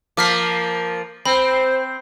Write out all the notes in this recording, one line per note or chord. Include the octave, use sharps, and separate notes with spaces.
F3 A#3 D6 F6 B6
C4 C5 B5